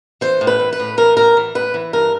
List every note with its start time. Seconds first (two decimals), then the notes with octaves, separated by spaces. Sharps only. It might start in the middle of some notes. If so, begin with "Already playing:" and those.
0.21 E3 C5
0.41 A2
0.47 B4
0.59 E3
0.73 B4
0.79 A2
0.97 E3 A#4
1.17 A2 A#4
1.37 E3
1.55 A2 B4
1.74 E3
1.93 G2 A#4